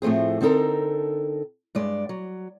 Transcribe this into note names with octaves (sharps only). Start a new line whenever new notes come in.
A2 F3 A3 C4 G#4
D3 C4 D#4 A4 A#4
G2 G#3 D5
F#3